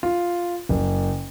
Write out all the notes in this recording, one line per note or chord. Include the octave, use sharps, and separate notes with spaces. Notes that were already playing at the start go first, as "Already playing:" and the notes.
F4
F#1